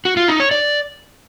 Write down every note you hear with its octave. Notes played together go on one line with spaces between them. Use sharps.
F#4
F4
D#4
C#5
D5